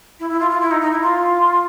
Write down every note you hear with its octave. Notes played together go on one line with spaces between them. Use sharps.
E4
E4
F4
F4
E4
D#4
D#4
E4
F4